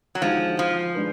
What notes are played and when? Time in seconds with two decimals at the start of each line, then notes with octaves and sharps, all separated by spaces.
0.15 F#3
0.22 D3 F3 G#3 D#4 F#4
0.59 F3
0.95 G#3 D4 F4 B4